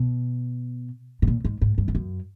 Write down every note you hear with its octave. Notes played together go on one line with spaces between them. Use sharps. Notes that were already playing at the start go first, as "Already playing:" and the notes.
Already playing: B2
B2
A#2
G#2
G#2
G2
F2
F#2